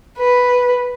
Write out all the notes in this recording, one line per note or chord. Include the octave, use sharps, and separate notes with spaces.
B4